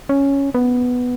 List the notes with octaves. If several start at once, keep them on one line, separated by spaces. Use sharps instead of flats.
C#4
B3